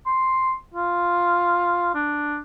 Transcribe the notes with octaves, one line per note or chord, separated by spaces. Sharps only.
C6
F4
D4